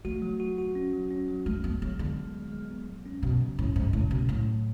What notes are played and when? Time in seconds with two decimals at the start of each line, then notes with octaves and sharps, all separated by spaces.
0.05 A3 F#4
0.22 F#3
0.40 F#4
0.58 F#4
0.75 C#4
0.93 F#3
1.11 C#4
1.28 F#3
1.46 G#3 A3
1.64 B3 D4
1.82 G#3 C#4
1.99 D3 G#3
2.17 G#3
2.35 G#3
2.52 G#3
2.70 B3
2.88 F#3
3.05 C#4
3.23 B2 F#3
3.40 C#3
3.58 A2 C#4
3.76 G#2 F#3
3.93 A2 C#3
4.11 B2 C#4
4.29 A2 F#3
4.46 F#3